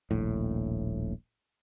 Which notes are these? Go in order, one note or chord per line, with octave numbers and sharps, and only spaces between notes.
D#1 A#1 A2